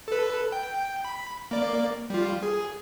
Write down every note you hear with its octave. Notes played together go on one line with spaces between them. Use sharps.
A4 B4
G5
B5
A#3 D5
G3 F4
G#4